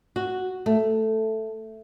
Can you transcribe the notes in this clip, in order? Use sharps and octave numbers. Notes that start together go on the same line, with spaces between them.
F#4
A3